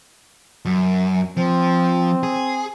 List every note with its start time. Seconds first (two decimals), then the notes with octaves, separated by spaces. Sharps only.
0.65 F#2
1.37 F3 C4
2.23 G#4